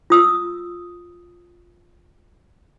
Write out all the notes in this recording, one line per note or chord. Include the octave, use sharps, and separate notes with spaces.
F4 D#6 E6